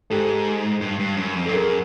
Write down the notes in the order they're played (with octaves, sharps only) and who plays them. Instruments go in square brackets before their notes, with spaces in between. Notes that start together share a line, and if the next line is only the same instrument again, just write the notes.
[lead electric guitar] G#2 [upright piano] G4 A4
[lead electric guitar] G2
G2
F#2
F2
[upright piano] A4
[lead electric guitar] G2
[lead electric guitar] F#2 [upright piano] G#4 A#4